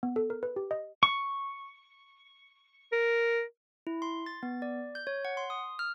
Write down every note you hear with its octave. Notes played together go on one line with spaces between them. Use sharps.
B3
A4
A#4
B4
G4
D#5
C#6
A#4
E4
C6
A6
B3
D5
G6
C#5
F#5
C6
D#6
F6